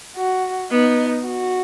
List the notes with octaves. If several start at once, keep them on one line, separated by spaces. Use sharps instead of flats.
F#4
B3 D#4
F#4